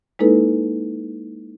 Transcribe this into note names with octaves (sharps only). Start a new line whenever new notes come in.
G#3 A#3 D#4 E4 A4 B4